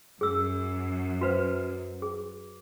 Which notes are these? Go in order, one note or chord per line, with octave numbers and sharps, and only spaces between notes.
F#2 G#4 E6
F#4 B4 C5
G#4